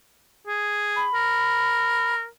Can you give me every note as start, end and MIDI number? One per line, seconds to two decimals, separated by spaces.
0.47 1.07 68
0.96 2.15 83
1.14 2.27 70